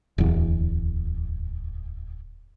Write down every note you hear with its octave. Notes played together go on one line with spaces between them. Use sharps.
D1 E2